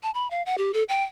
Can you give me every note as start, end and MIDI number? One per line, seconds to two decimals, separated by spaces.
0.03 0.11 81
0.14 0.29 83
0.31 0.42 77
0.46 0.58 78
0.58 0.72 67
0.74 0.83 69
0.89 1.04 79